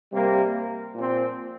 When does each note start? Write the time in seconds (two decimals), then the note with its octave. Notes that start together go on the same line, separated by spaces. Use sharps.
0.13 C3 G3 A#3
0.95 A#2 F3 C4